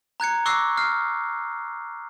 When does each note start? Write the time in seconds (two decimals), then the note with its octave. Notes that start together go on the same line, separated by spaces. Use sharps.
0.20 A#5 F#6 G#6 C#7
0.46 C#6 D6 E6 F#6 A#6 C7
0.77 F6 C7